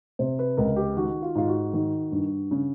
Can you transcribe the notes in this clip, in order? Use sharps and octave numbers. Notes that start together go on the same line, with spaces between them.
C3 C5
B4
C#2 A#4
G4
D#3 F#4
F4
G#2 F4
F#4
D#3
G2
C#3